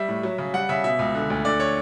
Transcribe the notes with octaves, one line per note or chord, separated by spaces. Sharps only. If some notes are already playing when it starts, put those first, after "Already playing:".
Already playing: G3 E5
A2
F#3
C#3
G3 F#5
C#3 E5
B2 E5
C#2
D3
D2
D3 D5
C#5